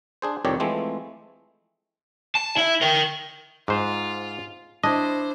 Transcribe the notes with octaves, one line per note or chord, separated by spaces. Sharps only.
D4 G#4 C5
C2 F2 D#3 G4 C#5 D5
E3 F3 G#3 A3 C4
A5
E4 E5
A#4 G5
G#2 F4 C5
D4 E4 C5 D#5